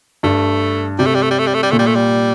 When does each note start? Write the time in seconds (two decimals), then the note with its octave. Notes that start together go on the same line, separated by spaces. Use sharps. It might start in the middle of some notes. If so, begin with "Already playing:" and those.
0.23 G2 A3
0.99 C3 G3
1.06 A3
1.14 G3
1.22 A3
1.31 G3
1.39 A3
1.47 G3
1.54 A3
1.63 G3
1.71 A#2 A3
1.79 G3
1.87 A3
1.95 G3